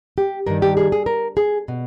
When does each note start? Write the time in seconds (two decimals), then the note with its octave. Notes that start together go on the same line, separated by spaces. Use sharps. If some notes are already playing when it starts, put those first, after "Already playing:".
0.18 G4
0.47 G2 D#3 A#4
0.62 G4
0.77 G#4
0.92 G#4
1.06 A#4
1.37 G#4
1.68 B2